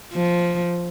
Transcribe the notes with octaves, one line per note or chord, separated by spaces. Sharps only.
F3